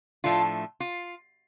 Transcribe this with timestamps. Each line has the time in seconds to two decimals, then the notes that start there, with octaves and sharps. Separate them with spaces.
0.24 A2 F3 A3 D4 F4
0.80 F4